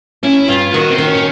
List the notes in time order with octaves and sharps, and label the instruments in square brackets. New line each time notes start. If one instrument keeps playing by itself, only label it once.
[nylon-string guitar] C#4 [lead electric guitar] E4
[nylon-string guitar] G2 [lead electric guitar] F4
[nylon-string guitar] D#3 [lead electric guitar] F#4
[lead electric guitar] C4
[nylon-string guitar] D#3
[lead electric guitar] C#4